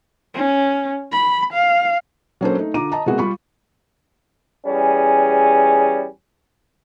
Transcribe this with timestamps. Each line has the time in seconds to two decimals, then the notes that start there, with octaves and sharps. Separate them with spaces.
0.34 C#4
1.12 B5
1.53 F5
2.41 F#3 A#3 C#4 D4 A4 C5
2.58 A3 D#4
2.74 D3 F4 A#5 D6 D#7
2.92 D#5 A5 A#5
3.06 C3 G#3 A#3 B3 F#4 G#4
3.19 G3 F4 B5 C#6
4.67 E2 G3 C#4 G#4